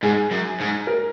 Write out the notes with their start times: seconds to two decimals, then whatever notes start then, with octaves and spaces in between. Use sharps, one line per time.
0.03 G#2 G#4
0.31 F#2
0.60 G#2
0.87 A#4